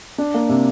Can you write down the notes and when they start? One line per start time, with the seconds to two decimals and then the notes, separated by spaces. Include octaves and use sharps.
0.18 D4
0.34 A#3
0.49 C3